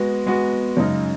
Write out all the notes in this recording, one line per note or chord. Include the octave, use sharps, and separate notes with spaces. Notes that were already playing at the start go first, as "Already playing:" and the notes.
Already playing: G#3 B3 F#4
G#3 B3 F#4
F#2 C#3 G#3 D#4